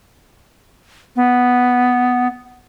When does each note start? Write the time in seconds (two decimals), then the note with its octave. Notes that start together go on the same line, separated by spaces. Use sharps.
1.16 B3